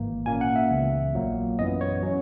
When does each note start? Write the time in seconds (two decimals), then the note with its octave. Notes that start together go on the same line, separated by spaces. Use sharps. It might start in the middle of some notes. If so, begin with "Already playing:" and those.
Already playing: G#1 G#2 E3 A#3
0.26 A#2 A#3 C#4 G#5
0.41 F#5
0.56 E5
0.70 C#2 C#3 E3 B3
1.15 A#1 A#2 F#3 A#3
1.59 F#2 E3 B3 D#5
1.81 C#5
2.03 F#3 C#4